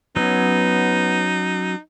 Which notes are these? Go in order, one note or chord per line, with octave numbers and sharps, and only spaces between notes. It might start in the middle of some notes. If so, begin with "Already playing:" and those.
F#3 B3 C#4 D#4